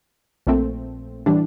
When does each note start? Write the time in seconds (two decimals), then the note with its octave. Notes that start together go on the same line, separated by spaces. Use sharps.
0.47 A#1 A#2 A3 C4
1.26 A2 E3 G3 D4